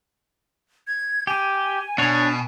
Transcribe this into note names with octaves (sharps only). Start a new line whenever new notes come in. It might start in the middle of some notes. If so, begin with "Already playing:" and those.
G#6
G4 G#5
B2 D4 C#5